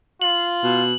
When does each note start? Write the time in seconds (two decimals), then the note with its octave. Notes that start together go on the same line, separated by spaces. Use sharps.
0.22 F4 F#7
0.63 B2